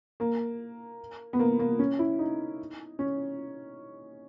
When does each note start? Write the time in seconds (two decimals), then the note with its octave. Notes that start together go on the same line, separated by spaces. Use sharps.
0.20 A#3
1.33 B3
1.39 A#3
1.59 A#3
1.79 C#4
1.99 E4
2.19 D#4
2.99 C#4